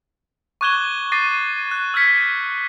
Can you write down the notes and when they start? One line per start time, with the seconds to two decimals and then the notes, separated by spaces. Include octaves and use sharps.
0.61 C#6 D6 F#6 G#6 E7 G7
1.12 D6 A6 A#6 C7 D#7
1.71 F#6
1.94 E6 F6 G#6 B6 C#7